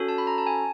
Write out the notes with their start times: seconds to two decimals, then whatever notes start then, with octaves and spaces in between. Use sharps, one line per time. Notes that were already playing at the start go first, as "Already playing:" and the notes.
Already playing: C#4 F#4 A4
0.08 A5
0.18 B5
0.27 A#5
0.38 A5
0.47 G#5